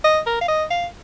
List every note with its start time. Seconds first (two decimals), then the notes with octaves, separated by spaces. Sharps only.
0.04 D#5
0.26 A#4
0.41 F5
0.48 D#5
0.71 F5